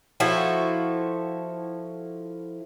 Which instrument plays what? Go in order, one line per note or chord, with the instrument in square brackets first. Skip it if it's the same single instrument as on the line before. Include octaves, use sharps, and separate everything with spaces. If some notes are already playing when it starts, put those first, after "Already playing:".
[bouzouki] F3 E4 F#4 A4